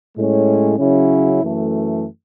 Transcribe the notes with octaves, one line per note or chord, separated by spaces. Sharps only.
A2 G#3 C#4
C#3 F#3 C#4 E4
F#2 E3 A3